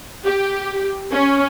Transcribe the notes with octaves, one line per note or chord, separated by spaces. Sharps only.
G4
C#4